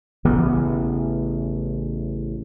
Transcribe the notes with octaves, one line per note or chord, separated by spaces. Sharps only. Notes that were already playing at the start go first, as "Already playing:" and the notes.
A1 C#3 E3 B3